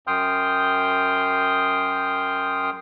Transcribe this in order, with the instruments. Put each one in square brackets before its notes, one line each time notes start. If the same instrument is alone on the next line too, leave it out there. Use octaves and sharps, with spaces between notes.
[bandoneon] F#2 G5 C6 D#6 F6 G6